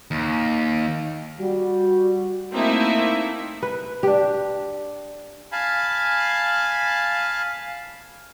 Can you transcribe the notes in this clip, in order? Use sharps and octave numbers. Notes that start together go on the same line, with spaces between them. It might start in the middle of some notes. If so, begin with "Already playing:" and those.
D#2
G3 F#4
A3 A#3 C4 D#4 E4 E5
B4
D4 G4
F5 G#5 A5 B5